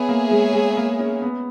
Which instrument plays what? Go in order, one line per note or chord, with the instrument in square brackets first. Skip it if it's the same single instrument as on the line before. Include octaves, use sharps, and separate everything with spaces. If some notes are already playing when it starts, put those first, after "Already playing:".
Already playing: [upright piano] B3 [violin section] G#4 C#5 E5
[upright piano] A#3
G#3
G#3
A#3
C#4
B3